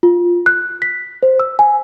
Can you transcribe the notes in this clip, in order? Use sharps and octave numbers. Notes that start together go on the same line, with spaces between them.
F4
F#6
B6
C5
E6
G#5